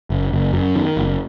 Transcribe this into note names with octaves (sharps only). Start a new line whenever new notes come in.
F#1
F#1
F#2
D#3
F#1